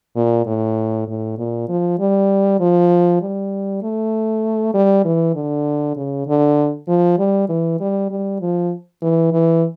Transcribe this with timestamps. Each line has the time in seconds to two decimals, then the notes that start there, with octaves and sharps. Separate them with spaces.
0.16 A#2
0.46 A2
1.08 A2
1.38 A#2
1.69 F3
1.99 G3
2.60 F3
3.22 G3
3.82 A3
4.74 G3
5.05 E3
5.35 D3
5.96 C#3
6.27 D3
6.88 F3
7.18 G3
7.49 E3
7.80 G3
8.10 G3
8.41 F3
9.02 E3
9.32 E3